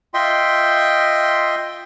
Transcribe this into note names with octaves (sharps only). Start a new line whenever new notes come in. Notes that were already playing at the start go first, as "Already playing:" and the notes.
F4 D#5 E5 G5 C6